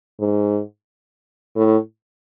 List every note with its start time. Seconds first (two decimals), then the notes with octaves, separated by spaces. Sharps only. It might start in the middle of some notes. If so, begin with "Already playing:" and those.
0.20 G#2
1.56 A2